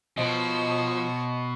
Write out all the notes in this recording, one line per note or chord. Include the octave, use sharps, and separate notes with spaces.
B2 F3 C5 C#5 D#5